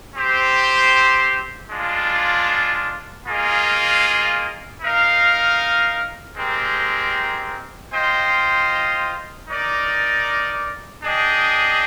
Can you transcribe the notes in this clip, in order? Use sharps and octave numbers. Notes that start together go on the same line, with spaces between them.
C4 G4 C5
G#3 D4 F4
A#3 F4 G#4 D#5
D#4 A#4 F5
G#3 C4 G4 A#4
F4 C5 D#5 G5
D#4 A#4 D5
D4 G#4 D#5 G5